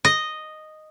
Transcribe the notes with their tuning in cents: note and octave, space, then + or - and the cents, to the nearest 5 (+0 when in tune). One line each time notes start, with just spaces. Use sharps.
D#5 -5